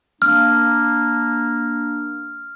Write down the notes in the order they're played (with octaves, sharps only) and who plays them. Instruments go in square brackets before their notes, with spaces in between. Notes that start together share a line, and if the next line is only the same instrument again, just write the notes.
[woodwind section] A#3 D4 [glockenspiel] F6